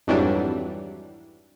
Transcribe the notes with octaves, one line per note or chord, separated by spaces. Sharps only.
G#1 F2 E3 F#3 G3 D4